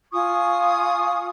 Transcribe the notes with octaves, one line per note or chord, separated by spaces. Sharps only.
F4 G#5 C#6 D#6